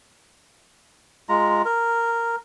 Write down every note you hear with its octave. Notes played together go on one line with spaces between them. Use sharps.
G#3 F4 A#5
A#4